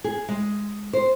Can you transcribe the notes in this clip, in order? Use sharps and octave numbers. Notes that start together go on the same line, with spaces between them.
G#4
G#3
C5